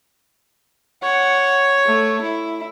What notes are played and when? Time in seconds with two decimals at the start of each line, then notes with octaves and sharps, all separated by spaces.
1.03 C#5 F#5
1.86 A3
2.22 E4